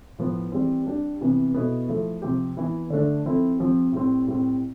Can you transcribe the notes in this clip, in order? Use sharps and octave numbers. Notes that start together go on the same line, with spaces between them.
A2 F3 B3
E3 G3 C4
G3 D4 G4
C3 E3 B3
B2 B3 E4 A4
F3 A3 E4 A4
C3 F3 C4 G4
E3 B3 E4
D3 A3 D4
F3 C4 E4 A4
F3 C4 G4
A2 G3 C4
A2 G3 C4